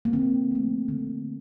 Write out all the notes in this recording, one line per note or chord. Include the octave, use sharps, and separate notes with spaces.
A#3
D3 C4
F3 A3
D3